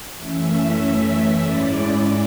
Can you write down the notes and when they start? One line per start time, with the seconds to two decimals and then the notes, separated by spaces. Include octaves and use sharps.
0.16 F#2 E3 A3 C#4 E5
1.38 G#2 G#3 C#4 E4 D5